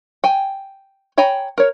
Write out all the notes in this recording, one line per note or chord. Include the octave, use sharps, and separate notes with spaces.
G5 G#5
C#5 G5 G#5 A#5 B5
A#4 C#5